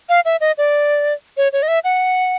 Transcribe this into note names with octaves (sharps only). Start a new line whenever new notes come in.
F5
E5
D#5
D5
C#5
C#5
D#5
E5
F#5